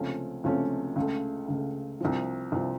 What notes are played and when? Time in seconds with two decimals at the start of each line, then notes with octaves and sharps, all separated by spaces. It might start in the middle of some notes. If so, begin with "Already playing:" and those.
Already playing: C#2 C3 F3 A3 C#4
0.44 C#2 C3 F3 A3 C#4
0.96 C#2 C#3 A3
1.48 C#2 C#3 A3
2.00 C2 C3 F3
2.52 C2 C3 F3